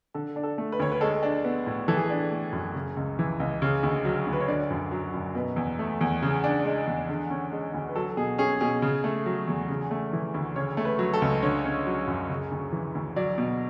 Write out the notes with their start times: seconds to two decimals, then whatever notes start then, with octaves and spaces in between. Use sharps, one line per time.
0.14 D3 A4
0.36 D4
0.43 A4
0.58 A3
0.72 B4
0.80 D2 C#5
0.92 B4
1.01 G#3 A4
1.23 D4
1.44 B3
1.66 A2
1.88 E3 A4
1.97 G#4
2.06 D4 A4
2.31 A3
2.53 F#2
2.74 C#3
2.97 C#2
3.19 E3
3.40 C#2
3.62 C#3
3.83 D2
4.05 F#3
4.27 D2
4.33 B4
4.40 C#5
4.48 D3 D5
4.70 F#2
4.92 F#3
5.14 F#2
5.35 B2 B4
5.56 E2
5.79 A3
6.01 E2
6.22 C#3
6.44 D4
6.65 G#3
6.87 E2
7.09 D3
7.30 C#4
7.52 G#3
7.74 D2
7.89 B4
7.96 F#3 A4
8.17 B2 G#4
8.38 C#4 G#4
8.61 B2 G#4
8.82 C#3
9.04 A3
9.26 F#3
9.47 E2
9.69 C#3
9.91 A3
10.13 E3
10.34 D2
10.55 C#3 C#5
10.77 A3
10.85 B4
10.99 F#3
11.14 A4
11.22 C#2
11.42 D3 C#5
11.65 C#4
11.86 F#3
12.07 F#2
12.29 C#3
12.52 D2
12.72 E3
12.95 D2
13.16 F#3 D5
13.38 B2